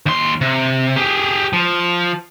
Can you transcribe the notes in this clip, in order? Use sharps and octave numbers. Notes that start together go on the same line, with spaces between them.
D#2 C6
C3
G4 G#4
F3